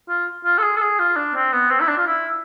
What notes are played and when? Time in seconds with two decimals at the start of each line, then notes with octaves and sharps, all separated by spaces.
0.09 F4
0.45 F4
0.58 A4
0.62 G#4
0.77 A4
0.81 G#4
0.99 F4
1.16 D4
1.35 C4
1.52 B3
1.70 C4
1.80 E4
1.88 D4
1.98 F4
2.06 E4